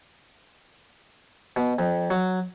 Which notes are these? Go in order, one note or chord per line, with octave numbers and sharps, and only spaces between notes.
B2
F2
F#3